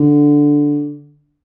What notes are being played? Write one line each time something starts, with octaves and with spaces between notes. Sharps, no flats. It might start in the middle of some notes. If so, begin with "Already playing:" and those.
Already playing: D3